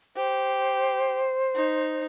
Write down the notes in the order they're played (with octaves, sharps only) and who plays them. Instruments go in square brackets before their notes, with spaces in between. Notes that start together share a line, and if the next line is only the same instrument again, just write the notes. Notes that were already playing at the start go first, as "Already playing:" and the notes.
[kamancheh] G4 [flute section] C5
[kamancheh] D#4